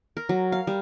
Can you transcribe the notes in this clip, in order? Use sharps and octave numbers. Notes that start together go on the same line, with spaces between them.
A#4
F#3
F5
G3